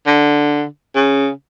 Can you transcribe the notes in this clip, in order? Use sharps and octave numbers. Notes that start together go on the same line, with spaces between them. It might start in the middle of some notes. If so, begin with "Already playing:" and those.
D3
C#3